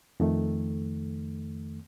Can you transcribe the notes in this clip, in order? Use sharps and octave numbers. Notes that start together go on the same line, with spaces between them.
F2 D#3 A3